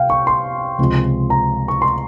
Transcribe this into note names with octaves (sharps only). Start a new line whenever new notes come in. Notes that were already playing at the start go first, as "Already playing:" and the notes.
Already playing: C3 F5 G5
C#6
C6
C#2 C3 F3 G#3
A#5
C#6
C6